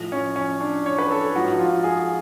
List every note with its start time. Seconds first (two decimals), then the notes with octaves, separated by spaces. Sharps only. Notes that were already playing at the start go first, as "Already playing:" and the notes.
Already playing: A2 F3
0.12 C#4
0.36 C#4
0.61 D4
0.86 C#5
0.99 B4
1.11 A4
1.35 G#2 F3 F#4
1.59 F4
1.84 G#4